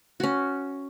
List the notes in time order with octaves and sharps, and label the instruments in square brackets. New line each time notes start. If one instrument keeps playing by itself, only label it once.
[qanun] C#4 F#4